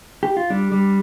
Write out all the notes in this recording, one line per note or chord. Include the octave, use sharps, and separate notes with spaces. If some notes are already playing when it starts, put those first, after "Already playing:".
G4
F4
G3 D4
G3